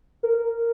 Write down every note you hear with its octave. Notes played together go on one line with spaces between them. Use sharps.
A#4